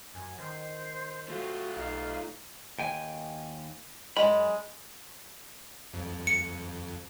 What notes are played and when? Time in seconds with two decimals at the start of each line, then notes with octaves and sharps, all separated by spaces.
0.14 F#2 G#5
0.38 D#3 C5
1.29 A3 F4 F#4
1.76 B1 D#4 F5
2.79 D#2 G5 G#5
4.17 F#2 G#3 B5
5.94 F2
6.27 C#7